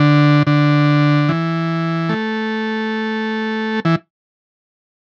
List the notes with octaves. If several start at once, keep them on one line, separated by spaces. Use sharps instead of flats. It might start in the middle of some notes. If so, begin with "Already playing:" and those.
Already playing: D3
D3
E3
A3
E3